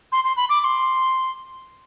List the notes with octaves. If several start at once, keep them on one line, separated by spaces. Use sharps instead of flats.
C6
C6
B5
D6
D6
C6